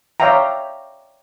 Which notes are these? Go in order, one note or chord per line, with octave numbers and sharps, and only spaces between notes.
C#5 D5 E5 F5 G5 A#5